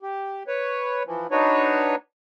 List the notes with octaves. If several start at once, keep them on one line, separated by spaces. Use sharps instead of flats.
G4
B4 C#5
E3 F3
D4 D#4 F#4 B4 C#5